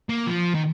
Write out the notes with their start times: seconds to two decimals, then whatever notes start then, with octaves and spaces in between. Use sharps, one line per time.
0.09 A#3
0.27 F3
0.55 D#3